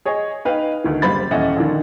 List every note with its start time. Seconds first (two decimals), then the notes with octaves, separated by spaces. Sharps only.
0.05 G#4 C#5 D#5
0.45 D#4 B4 F5 G5
0.84 D2 D#3
1.02 F#1 G3 C5 B5 A6
1.31 D#1 E2 C#4 D#5 E5 F#5
1.56 A#1 D3 D#3